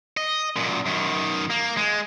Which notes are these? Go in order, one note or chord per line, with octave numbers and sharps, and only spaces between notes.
D#5
F#2 A#2
F#2 D#3
A#3
G#3